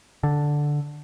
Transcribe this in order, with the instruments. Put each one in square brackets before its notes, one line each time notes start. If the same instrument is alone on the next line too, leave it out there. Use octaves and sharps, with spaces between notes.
[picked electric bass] D3